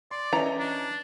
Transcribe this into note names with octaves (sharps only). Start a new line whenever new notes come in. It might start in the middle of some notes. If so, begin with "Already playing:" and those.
D5 C6
E3 C#4 C#5 D#5 A#5
D4